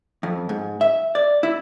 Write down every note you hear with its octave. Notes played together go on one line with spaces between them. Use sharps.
F2
G#2
E5
D5
E4